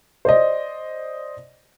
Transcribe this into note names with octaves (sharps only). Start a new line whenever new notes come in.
C5 D5 D#5